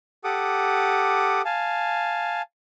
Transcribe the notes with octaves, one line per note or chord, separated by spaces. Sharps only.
G4 A4 F#5 D6 D#6
F5 G#5 A5